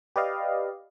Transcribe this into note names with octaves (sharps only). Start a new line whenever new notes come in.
G4 B4 D5 D#5 F5